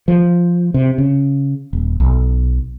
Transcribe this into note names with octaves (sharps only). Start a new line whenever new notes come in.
F3
C3
C#3
D#1
B1